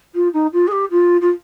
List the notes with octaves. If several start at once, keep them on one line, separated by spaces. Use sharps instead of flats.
F4
D#4
F4
G#4
G4
F4
F4